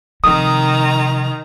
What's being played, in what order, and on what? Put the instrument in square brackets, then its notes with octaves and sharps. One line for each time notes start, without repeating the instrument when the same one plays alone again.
[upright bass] C3 F3 [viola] D#3 A#5 [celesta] D#6